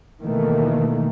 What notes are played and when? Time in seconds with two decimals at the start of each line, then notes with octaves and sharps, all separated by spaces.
0.21 B2 D#3 E3 A3 A#3